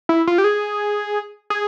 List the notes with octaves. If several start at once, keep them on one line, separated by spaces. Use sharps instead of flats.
E4
F4
G4
G#4
G#4